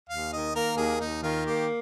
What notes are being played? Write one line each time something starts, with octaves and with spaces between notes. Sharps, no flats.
D#2 F5
D#3 D#5
A#3 A#4
D#2 G#4
D#2 D#4
D#3 F4
A#3 G4